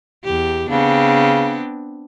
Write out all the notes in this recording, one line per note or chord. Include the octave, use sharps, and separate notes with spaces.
E2 G4
C#3 B3 C4 D4